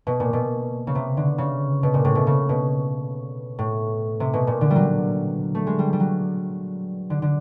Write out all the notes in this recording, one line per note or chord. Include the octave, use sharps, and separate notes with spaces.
B2
A#2
B2
C#3
C3
D3
C#3
B2
A#2
A2
B2
C#3
B2
A2
C3
B2
A#2
D3
G3
F#3
A3
G#3
G3
G3
F#3
D3
D3